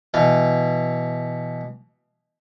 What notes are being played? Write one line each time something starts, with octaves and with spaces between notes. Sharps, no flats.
B2 E3 F5